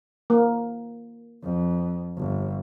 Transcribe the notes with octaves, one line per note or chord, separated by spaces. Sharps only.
A#3
F2
G1